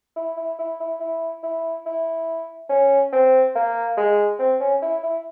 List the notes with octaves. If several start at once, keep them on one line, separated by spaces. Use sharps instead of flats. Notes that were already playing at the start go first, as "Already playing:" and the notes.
E4
E4
E4
E4
E4
E4
E4
C#4
C4
A#3
G#3
C4
C#4
E4
E4